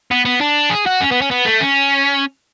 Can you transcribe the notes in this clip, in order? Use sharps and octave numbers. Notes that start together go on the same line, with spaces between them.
B3
B3
D4
G#4
F#4
C#4
B3
C#4
B3
A3
C#4